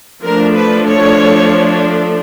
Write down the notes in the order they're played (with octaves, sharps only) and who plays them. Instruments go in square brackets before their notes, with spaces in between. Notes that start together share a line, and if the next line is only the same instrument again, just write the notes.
[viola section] F3 A3 D4 A#4
B4
C#5